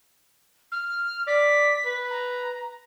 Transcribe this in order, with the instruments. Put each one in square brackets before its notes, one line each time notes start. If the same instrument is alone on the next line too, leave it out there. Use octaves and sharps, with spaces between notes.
[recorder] F6
[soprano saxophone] D5 [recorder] B6
[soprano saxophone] B4
[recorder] A#5